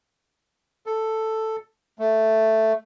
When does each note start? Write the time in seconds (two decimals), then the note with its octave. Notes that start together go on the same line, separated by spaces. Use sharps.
0.86 A4
1.99 A3